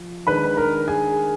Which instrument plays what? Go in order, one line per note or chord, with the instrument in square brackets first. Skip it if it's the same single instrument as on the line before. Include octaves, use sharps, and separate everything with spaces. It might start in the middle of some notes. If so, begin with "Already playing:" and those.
Already playing: [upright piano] F3
D#3 G#3 D4 B4 B5
A#4 A#5
G#4 G#5